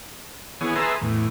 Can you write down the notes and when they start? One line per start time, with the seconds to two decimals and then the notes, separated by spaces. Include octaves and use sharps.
0.61 E3 B3 G#4 C#5
0.76 G#4 B4 E5 A5 A#5 C6
1.01 E2 A2